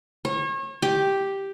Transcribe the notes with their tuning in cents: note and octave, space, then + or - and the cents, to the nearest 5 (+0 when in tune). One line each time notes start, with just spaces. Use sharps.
C#5 -35
G4 +0